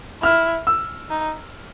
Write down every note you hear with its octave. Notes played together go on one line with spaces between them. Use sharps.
E4 F6
E6
D#4